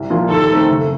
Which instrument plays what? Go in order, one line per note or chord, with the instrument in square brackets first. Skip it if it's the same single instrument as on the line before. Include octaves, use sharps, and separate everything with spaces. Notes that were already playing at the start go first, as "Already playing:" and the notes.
Already playing: [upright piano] C2
A#2 F3 A#3 F4
[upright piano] D#2 [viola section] A4
[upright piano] D#3 A3 C4
F#1